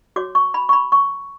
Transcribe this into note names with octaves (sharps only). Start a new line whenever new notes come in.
F#4 C#5 D6
C#6
B5
C#6
B5
C#6